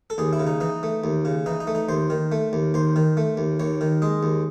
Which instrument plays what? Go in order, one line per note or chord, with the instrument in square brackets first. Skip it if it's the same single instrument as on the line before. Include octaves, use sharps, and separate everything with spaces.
[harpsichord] A4
D#2 G#4
E4
C#3
D#4
E3 D#4
A3
D#2
C#3
E3 D#4
D#4
A3
D#4
D#2 C5
D#3
A3
D#2
D#2 C5
D#3
A3
D#2
D#2 C#5
D#3
G#3 D#5
D#2